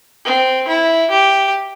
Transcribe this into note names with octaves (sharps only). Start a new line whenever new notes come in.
C4
E4
G4